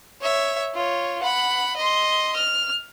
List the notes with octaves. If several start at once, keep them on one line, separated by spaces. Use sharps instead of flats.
C#5 E5
F4 C#5
F#5 B5
D#5 C6
F6